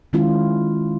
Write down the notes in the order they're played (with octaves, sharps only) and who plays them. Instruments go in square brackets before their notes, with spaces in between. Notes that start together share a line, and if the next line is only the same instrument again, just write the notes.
[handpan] D#3 G#3 C#4 E4 F4